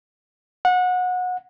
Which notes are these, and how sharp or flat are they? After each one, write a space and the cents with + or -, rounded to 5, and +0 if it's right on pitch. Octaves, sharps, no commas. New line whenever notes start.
F#5 -25